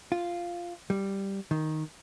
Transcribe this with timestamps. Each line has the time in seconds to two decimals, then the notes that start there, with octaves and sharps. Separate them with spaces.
0.12 F4
0.90 G3
1.51 D#3